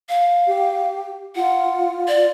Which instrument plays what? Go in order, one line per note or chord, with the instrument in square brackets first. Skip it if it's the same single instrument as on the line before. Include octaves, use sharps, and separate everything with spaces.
[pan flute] F5
[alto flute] G4
[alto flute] F4 [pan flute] F#5
[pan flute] D5